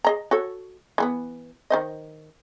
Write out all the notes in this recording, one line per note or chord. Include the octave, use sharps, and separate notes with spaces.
G#4 D#5 A#5
F#4 A4 C#5
E3 A#3 B3
D#3 C5 D#5